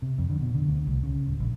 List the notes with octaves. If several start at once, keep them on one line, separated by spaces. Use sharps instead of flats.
C3
F2
D3
B2
D3
D2
C2
C#3
D1
A#1